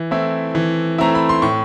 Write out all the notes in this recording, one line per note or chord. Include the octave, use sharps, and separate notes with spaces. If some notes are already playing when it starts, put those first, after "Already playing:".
Already playing: E3
A3 C4 E4
E3
A3 C4 E4 A#5
B5
C6
A2 C#6